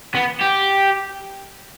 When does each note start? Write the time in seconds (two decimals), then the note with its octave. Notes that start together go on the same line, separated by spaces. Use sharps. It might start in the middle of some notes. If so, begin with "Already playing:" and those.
0.15 B3
0.41 G4